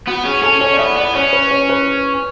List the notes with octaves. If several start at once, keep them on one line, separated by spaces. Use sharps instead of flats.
B3 F#4
C#4 G#4
C#4 A4
C#4 C#5
D5
B3 E5
B3 D5
C#4 C#5
B4
C#5
B4